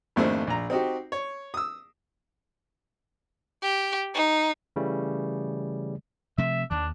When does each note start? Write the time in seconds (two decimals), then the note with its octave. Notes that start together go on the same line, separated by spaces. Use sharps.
0.16 G#1 F2 A3 A#3 D4 C5
0.47 A#1 A#5
0.70 C4 D#4 F#4 G4
1.12 C#5
1.54 D#6 E6
3.63 G4
4.14 D#4
4.76 C#3 E3 G3 A3
6.38 C3 F3 A3 E5
6.71 D#2 D#3 D4